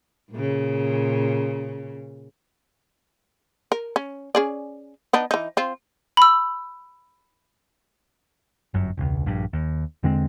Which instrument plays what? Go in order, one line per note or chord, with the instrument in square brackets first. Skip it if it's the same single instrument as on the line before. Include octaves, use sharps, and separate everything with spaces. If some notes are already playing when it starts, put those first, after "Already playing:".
[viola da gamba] A#2 C#3
[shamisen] A#4
C#4
C#4 G#4 D5
B3 D4 D#4
E3 D#4
C4 F4
[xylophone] B5 E6
[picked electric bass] G1 F#2
E1 C#2
A#1 G2
D#2
E2 D3 G#3 C4